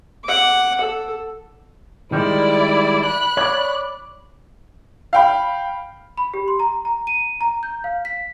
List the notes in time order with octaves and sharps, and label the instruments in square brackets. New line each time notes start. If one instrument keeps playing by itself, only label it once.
[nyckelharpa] F#5 D6
A4
[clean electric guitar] D#3 G3 G#3 [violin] E4 D5
[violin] B5 F#6
[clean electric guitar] C#5 D5
[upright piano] F5 G5 B5
[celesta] B5
G4
C6
A#5
A#5
D#7
A#5
G6
F5
B6